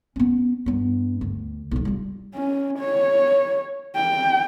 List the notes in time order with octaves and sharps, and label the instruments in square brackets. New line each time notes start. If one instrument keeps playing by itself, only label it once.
[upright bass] B3 C#4
G2 B3
D2
B1 F3
G3 F4
[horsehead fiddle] C#4
C#5
G5